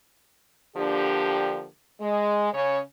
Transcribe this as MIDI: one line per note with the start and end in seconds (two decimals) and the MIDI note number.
0.77 1.67 50
0.77 1.67 53
0.77 1.67 58
0.77 1.67 62
0.77 1.67 67
2.00 2.49 56
2.53 2.80 49
2.53 2.80 61
2.53 2.80 73